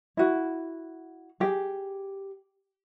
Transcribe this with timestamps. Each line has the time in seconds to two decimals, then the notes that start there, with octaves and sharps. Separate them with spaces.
0.17 E4 F#4
1.40 G4 G#4